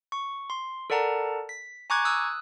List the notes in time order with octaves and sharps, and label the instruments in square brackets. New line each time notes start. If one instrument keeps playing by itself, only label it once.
[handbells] C#6
C6
A4 A#4 D5 F#5 A5 A#5
B6
G#5 A#5 C#6 D6 F#6 G#6
D#6 E6 F#6